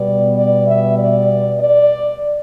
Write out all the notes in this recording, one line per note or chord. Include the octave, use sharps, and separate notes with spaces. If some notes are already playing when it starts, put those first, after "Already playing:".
Already playing: B2 G3 B3 D5
D5
E5
D5
D5